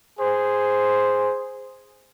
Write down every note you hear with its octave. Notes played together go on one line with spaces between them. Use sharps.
G#4 C5